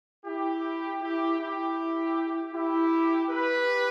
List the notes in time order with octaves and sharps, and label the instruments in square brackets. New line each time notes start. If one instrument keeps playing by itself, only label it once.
[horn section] E4 G4
E4 G4
E4 G4
E4 G4
G4 B4